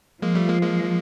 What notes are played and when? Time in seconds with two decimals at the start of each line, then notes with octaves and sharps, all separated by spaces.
0.22 F3 G#3 A#3
0.35 G3 A3
0.49 G#3 A#3
0.62 G#3 A#3